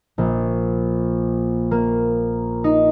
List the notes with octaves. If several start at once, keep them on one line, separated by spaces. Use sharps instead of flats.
A#1
A#3
D#4